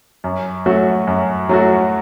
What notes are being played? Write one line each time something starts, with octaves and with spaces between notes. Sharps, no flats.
F#2
F#3 A3 F#4
F#2
F#3 A3 F#4